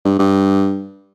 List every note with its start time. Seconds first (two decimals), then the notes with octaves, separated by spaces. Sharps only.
0.05 G2
0.19 G2